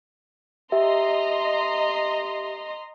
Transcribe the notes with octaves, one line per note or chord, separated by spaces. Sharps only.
G4 D#5 E5 A#5 C6